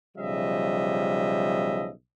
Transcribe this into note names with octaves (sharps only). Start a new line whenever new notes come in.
B1 C#3 F3 G3 D#5 E5